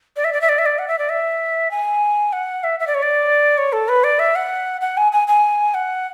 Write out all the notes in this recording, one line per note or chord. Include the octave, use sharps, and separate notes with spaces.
D5
E5
D5
E5
D5
E5
D5
F#5
E5
D5
E5
G#5
F#5
E5
E5
D5
C#5
D5
C#5
A4
B4
D5
E5
F#5
F#5
G#5
G#5
G#5
F#5